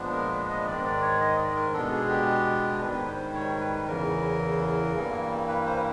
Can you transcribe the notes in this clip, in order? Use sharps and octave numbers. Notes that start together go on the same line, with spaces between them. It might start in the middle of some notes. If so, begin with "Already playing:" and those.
Already playing: A#2 F3 G#3 B3 D4
A#4
B4
D#5
G#2 D#3 G#3 D5
D5
C#5
D#5
D5
A#4
B2 G#3 B3 D4 A4
G#4
G4
G#2 D#3 G3 B4
C5
C#5
B4
E2 C#3 E3 A#4
G2 E3 G3 A#3
B4
C5
B4